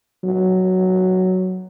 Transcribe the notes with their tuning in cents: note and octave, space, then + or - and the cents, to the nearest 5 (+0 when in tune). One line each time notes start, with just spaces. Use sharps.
F#3 +5